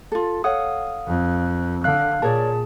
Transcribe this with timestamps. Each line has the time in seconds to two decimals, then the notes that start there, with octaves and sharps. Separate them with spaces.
0.12 F4 A4
0.44 A4 C#5 F5 F#5 D#6
1.07 F2
1.84 D3 F5 F#6
2.22 A#2 G#4 A#4 C#5 D5 A5